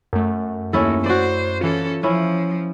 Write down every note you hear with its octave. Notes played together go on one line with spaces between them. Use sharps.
F#2 A3
D#2 C#4 E4 A4
F#4 C5 D5
E3 C#4 F4 A4
F3 C#4 E4